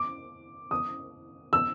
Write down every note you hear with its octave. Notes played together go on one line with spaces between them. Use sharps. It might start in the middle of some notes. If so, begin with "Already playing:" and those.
Already playing: D6
D#6
E6